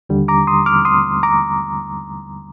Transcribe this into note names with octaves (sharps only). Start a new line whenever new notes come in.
D#2 D3 G3
A#5 D6
C6 D#6
D6 F6
C6 D#6
A#5 D6